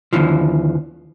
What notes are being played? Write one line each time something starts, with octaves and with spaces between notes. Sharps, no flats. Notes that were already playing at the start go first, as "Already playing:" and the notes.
D#2 A2 D3 E3 F3